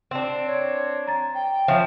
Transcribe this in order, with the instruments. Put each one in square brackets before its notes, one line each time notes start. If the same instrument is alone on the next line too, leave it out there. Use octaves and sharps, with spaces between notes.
[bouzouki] C4 D4
[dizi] C#5
[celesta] A#5 A6
[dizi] G5
[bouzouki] F3 C#4 [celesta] E5